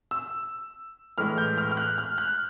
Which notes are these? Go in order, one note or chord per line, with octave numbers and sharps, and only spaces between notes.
E6
A2 E3 G#3 F6
G6
F6
F6
F#6
F6
F#6